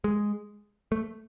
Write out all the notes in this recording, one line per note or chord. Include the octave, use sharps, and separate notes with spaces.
G#3
A3